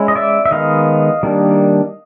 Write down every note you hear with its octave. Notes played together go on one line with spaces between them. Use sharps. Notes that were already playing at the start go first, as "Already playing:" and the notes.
Already playing: G#3 C#4 E4
D#5
D5 E5
E5
D#3 G#3 B3 D#5 F5
D#3 G3 A#3 D4